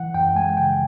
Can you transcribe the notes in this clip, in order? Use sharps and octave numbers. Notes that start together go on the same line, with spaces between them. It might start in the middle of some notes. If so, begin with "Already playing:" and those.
Already playing: E3 F#5
F#2 G5
G#3 G#5
C#3 G5